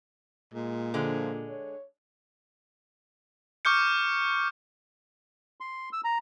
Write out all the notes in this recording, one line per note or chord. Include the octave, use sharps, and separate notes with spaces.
A#2 G#3
D3 F3 G#3
C#5
C#6 D6 F6 G6 C#7
C6
E6
A#5